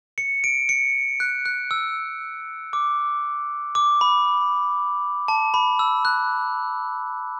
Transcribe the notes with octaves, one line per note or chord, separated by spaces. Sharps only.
C#7
D7
C#7
F#6
F#6
E6
D6
D6
B5
A5
B5
E6
F#6